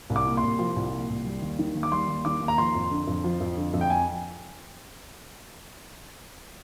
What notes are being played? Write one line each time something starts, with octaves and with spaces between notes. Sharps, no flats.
C2
D6
A#2
C6
C2
F3
C2
A#2
C2
G3
D#2
D#3
D#2
D6
G3 C6
D#2
D#3 D6
D#2
A#5
F3 C6
F2
D3
F2
F3
F2
D3
F2
G5
G#5